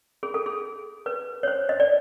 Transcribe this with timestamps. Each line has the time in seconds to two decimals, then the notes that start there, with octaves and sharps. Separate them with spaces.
0.23 G#4
0.34 A4
0.46 G#4
1.06 B4
1.43 C#5
1.48 C5
1.69 D#5
1.80 D5